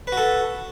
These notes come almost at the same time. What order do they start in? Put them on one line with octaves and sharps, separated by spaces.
B4 F#4 A4